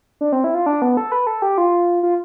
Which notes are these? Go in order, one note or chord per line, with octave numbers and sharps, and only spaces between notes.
D4
C4
E4
F4
D4
B3
A4
B4
A4
G4
F4
F4